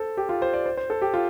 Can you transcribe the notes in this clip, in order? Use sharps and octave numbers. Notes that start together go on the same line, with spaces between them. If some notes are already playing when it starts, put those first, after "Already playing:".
Already playing: A4 C5
G4
F4
C5
D5
C5
C5
A4
G4
F4